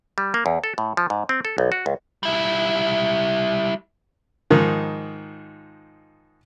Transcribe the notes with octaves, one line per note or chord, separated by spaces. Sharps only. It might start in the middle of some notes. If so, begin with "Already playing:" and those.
G3
A#3
E2
A4
A2
F3
G#2
C4
A4
B1
F#4
C#2
G3 E4
G#2 D#3 F3